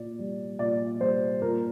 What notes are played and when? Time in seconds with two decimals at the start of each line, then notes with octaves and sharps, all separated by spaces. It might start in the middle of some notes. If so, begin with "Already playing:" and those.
Already playing: A#2 D5
0.19 G3
0.59 A#2 D5
1.00 G3 C5
1.42 A#2 A#4